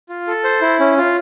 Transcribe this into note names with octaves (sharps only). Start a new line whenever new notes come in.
F4
A4
C5
E4
C#4
F4